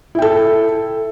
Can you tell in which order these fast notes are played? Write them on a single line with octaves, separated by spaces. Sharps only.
E4 G5 A4